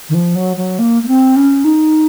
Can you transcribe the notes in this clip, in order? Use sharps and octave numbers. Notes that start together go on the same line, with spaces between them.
D#3
F3
F#3
F#3
A#3
A#3
C4
C#4
D#4